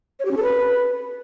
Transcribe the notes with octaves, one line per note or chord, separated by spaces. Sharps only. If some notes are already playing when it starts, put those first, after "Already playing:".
C#5
G4
C#4
A4
B4